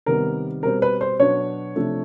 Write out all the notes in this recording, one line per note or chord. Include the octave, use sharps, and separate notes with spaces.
C3 D#3 G3 B3 A#4
B2 G3 C4 A#4
B4
C5
B2 F#3 B3 D4 C#5
C3 F3 A3 D4